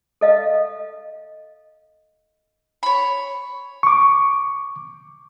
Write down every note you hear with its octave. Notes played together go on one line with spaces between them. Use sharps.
A4 D#5 F5
C#5 B5
C#6 D6